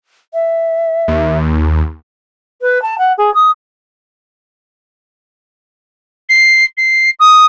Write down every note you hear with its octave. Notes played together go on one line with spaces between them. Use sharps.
E5
D#2
B4
A5
F#5
G#4
D#6
C7
C7
D#6